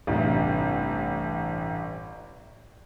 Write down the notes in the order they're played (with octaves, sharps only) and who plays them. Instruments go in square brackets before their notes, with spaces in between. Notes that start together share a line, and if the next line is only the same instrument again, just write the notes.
[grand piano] A1 G2 C3